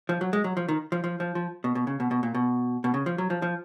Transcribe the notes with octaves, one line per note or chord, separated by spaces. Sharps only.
F3
F#3
G#3
F#3
F3
D#3
F3
F3
F3
F3
B2
B2
C#3
B2
B2
A#2
B2
B2
C#3
F3
F#3
F3
F3